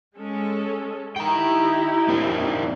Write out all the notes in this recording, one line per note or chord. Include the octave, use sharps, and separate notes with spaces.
G#3 C#4 A4
D#4 E4 G4 G5 A#5
A#3 C4 D4